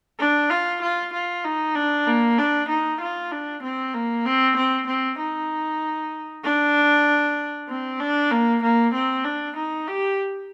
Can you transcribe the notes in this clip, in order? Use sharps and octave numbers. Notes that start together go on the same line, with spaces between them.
D4
F4
F4
F4
D#4
D4
A#3
D4
D#4
F4
D4
C4
A#3
C4
C4
C4
D#4
D4
C4
D4
A#3
A#3
C4
D4
D#4
G4